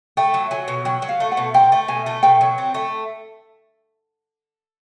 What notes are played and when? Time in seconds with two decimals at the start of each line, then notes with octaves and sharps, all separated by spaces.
0.17 A3 G5
0.34 F#3
0.51 F#3 G#5
0.68 B2
0.85 F#3 G5
1.02 F#3
1.09 F5
1.20 A3
1.32 F#5
1.37 B2
1.54 C4 G5
1.72 A3
1.88 B2 G#5
2.06 A3
2.23 B2 G5
2.41 F#3
2.58 C4
2.74 A3